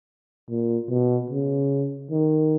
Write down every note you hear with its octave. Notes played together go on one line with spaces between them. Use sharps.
A#2
B2
C#3
D#3